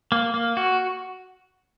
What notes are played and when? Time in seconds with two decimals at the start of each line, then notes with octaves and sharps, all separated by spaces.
0.12 A#3
0.34 A#3
0.57 F#4